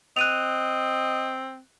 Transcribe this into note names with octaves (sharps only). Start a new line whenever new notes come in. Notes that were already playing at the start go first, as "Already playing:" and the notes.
C4 D#5 F#6 D#7 F7